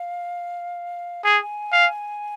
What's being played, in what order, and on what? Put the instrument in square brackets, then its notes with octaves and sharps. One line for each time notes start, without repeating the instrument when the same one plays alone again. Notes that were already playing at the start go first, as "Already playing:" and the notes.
Already playing: [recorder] F5
[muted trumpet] G#4 [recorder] G#5
[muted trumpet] F5